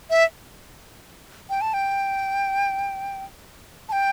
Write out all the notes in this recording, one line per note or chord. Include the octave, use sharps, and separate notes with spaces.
E5
G5
A5
G5
A5
G5